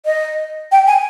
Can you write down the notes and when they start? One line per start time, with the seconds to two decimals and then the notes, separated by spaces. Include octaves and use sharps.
0.06 D#5
0.72 G5
0.87 G#5